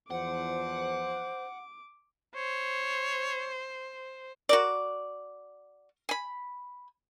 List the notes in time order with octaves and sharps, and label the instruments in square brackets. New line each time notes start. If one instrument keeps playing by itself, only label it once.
[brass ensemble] E2 F3 [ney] C5 [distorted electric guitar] F#5 [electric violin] D6
[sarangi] C5 [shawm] C#5
[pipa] F#4 A#4 D5
G#5 B5